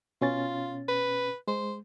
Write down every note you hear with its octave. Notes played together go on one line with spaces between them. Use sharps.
B2 C#4 F4 A6
B4
G#3 C5